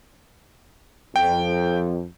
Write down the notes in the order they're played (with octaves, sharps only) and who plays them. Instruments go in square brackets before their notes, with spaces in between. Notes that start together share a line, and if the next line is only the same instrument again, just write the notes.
[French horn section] F2 [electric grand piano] G5